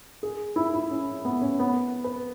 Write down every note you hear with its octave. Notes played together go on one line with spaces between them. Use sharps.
G#4
E4
E4
C#4
B3
C#4
B3
B4